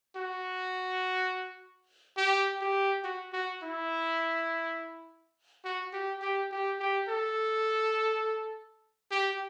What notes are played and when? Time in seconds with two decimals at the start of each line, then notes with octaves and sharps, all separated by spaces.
0.16 F#4
2.17 G4
2.61 G4
3.04 F#4
3.33 F#4
3.63 E4
5.65 F#4
5.93 G4
6.22 G4
6.51 G4
6.79 G4
7.08 A4
9.11 G4